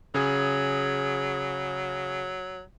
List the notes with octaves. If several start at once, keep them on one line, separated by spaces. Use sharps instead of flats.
C#3 F#3 G#4